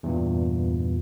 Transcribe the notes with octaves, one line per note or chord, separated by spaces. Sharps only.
E2 G2 A#2